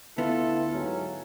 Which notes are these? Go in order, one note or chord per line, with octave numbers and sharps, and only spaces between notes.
D2 B3 E4 F4 A4
G#2 F#3 C#4